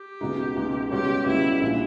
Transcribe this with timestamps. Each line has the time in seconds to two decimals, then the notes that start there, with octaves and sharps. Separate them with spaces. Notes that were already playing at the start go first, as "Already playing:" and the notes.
Already playing: G4
0.21 C#2 B2 G#3 D#4
0.56 C#2 B2 G#3 D#4
0.91 C#2 B2 G3 C#4 G4
1.26 C#2 B2 G3 C#4 E4
1.61 A#1 A#2 G3